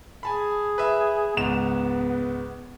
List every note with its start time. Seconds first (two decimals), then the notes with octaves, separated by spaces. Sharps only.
0.23 G#4 G#5 A5 B5
0.78 B4 E5
1.37 C#2 G#2 B3 E7